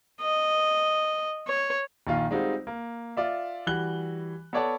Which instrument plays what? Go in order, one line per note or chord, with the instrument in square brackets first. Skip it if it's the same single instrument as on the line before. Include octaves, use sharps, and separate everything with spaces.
[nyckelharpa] D#5
C#5
[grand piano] A#1 D#3 F4 F5
G3 G#3 C4 D#4 F4 F#4
A#3
F4 D5 E5
E3 G3 F#4 F#6 G7
B3 A4 C#5 D5 F#5 A5